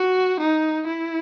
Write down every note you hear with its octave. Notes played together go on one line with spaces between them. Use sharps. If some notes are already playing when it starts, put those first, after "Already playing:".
Already playing: F#4
D#4
E4